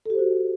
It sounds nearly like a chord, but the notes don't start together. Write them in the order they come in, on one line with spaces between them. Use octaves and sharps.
A4 G4 C5 F#4